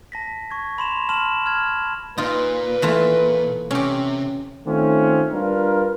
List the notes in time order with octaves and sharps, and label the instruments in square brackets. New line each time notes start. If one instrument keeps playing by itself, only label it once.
[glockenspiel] A5 A#6 B6
C#6 G#6
B5 C6 E7 F7
A5 C6 F6 E7 F#7
F6 G#6
[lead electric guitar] A#2 [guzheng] D#4 F4 [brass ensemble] B4
[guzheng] E3 A3 F4
[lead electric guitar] C3 [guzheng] C#4 G4
[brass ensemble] D#3 A3 C4 C#4 F4
G3 D4 F4 A#4 B4